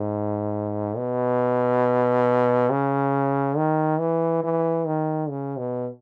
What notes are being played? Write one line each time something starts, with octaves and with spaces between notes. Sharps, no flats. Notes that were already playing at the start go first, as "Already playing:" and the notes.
Already playing: G#2
B2
C#3
D#3
E3
E3
D#3
C#3
B2